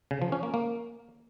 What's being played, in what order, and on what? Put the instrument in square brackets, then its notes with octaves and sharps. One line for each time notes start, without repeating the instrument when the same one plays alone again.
[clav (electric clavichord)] C#3
F3
C#4
A#3
A#3